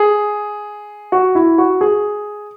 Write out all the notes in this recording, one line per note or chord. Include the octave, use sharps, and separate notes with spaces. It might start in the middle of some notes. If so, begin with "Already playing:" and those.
Already playing: G#4
F#4
E4
F#4
G#4